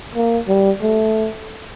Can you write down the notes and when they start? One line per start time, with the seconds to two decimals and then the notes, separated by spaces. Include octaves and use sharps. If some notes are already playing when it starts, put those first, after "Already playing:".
0.15 A#3
0.48 G3
0.82 A3